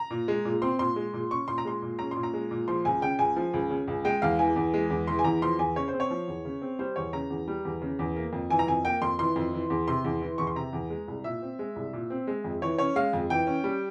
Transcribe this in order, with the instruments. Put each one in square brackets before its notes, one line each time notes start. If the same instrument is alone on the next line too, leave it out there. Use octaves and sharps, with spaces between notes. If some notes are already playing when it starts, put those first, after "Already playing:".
Already playing: [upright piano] A#5
A#2
G#3
A#2
C4 C6
A#2 C6
G#3
A#2
C#4 C#6
A#2 C6
A#5
G#3 C6
A#2
C#4 A#5
A#2 C6
A#5
G#3
A#2
F3 C6
C#2 G#5
C#3 G5
C#2 G#5
F3
C#2
C#3
C#2
G#3 G5
E2 F5
E3 G#5
E2
G#3
E2
E3 C6
G#5
E2 A#5
F3 C6
E2 G#5
C#3 C#5
C5
C4
C#5
F3
E2
C#3
C4
G3 C5
E2 C#5
C#3 A#5
E2
G3
E2
C#3
E2
A#3
F2
E3 G#5
A#5
F2 G#5
A#3 G5
F2 C6
E3 C6
F2
E3
E2
C3 C6
E2
E3
E2 C#6
C6
C3 A#5
E2
G#3
C2
A#2 E5
C4
G#3
C2
A#2
C4
G#3
F2
E3 C#5
C#4 C#5
G#3 F5
F2
E3 G5
C#4
G3